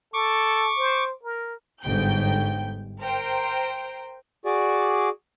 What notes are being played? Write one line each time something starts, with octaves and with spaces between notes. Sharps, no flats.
A4 C#6 D6
C5
A#4
G1 G#2 G5 G6
A#4 C5 G5
F#4 G#4 D5